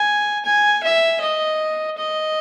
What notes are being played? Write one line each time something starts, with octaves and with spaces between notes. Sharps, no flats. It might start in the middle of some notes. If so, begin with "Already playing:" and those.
Already playing: G#5
G#5
E5
D#5
D#5